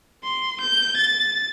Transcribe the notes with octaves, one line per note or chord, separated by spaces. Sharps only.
C6
G6
A6